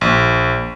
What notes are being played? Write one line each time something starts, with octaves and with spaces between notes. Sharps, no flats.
A#1